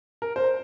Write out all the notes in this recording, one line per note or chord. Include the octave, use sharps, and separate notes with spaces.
A#4
C5